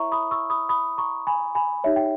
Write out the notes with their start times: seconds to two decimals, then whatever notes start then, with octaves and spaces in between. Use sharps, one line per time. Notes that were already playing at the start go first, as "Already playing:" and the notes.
Already playing: E4 A#4 C#5 E5 A#5 C#6
0.12 B5 D#6
0.31 C#6 E6
0.50 B5 D#6
0.69 B5 D#6
0.98 A#5 C#6
1.27 G#5 B5
1.55 G#5 B5
1.84 D#4 G4 C#5 E5
1.96 G5